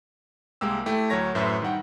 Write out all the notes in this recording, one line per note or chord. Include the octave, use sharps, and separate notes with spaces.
C2 G#3 A#3 G4 E6
A3 E4 G4
D2 F#3 A#4 C#5 A#6
F#2 A2 B4 C5 E5
D#3 G3 F#5 G5